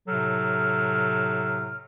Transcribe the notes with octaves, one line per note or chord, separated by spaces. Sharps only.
A2 C3 F#3 A4 F6